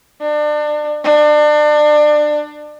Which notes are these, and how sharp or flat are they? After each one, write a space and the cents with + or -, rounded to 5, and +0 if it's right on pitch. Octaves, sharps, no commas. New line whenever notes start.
D4 +30
D4 +30